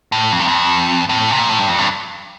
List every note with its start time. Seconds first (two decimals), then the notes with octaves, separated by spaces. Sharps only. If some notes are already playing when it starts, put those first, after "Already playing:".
0.12 A2
0.32 F2
0.40 G2
0.48 F2
1.09 A2
1.31 C3
1.39 A#2
1.49 A2
1.59 G2
1.68 F2
1.78 G2